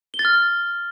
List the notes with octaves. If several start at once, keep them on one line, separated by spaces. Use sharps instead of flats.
G7
A6
F6